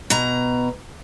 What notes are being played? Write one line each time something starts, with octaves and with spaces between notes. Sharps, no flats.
B2 A#5